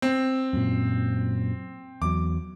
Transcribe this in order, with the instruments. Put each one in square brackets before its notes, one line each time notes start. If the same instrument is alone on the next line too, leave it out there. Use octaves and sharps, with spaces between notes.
[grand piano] C4
[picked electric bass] F#2 A#2
[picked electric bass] E2 F#3 [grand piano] D6